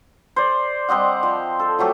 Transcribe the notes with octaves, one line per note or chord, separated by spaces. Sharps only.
C5 D5
G3 C4 D#5 F#5
F3
A4
F3 F#3 A3 G4